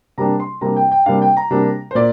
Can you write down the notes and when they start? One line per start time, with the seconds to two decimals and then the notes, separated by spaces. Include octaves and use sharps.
0.18 C3 G3 A#3 D4 A#5
0.40 C6
0.61 C3 G3 A#3 D4 A#5
0.77 G5
0.92 G5
1.06 C3 G3 A#3 D4 F5
1.22 G5
1.37 A#5
1.51 C3 G3 A#3 D4
1.91 C5
1.95 A#2 D5